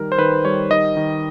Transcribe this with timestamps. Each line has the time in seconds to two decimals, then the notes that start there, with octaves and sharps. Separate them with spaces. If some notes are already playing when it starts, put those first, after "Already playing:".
Already playing: D#3 G3 A#4
0.12 C5
0.18 D#3 B4
0.45 G3 C#5
0.71 D#3 D#5
0.97 D#3